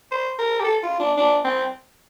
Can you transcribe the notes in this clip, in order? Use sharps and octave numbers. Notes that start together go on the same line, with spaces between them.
C5
A#4
G4
A4
F4
D4
D4
C4